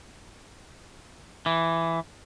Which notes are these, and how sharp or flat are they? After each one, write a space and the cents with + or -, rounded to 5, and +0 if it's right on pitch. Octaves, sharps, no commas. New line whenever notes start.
E3 +5